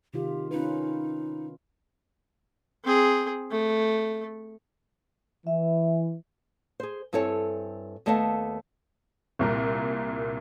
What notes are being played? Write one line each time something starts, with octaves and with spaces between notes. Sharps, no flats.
C3 D#3 F4 G4
C#4 D#4 F4 B4
C4 G#4
A3
E3 E5
G#4 C5
G2 C4 E4 A4 C#5 G#5
D#2 A3 B3 D#5 F5 A5
C2 A#2 A#4